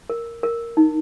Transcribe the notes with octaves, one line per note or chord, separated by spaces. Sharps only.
A#4
A#4
D#4